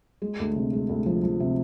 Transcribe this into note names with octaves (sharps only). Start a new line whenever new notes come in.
G#3
D2
C3
G#3
D2
F3
F3
C3